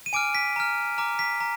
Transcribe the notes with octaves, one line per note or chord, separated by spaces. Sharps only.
D#7
G#5 D6 F6 D7
B6
A#5 F6
A#5 D6 F6
B6
A#5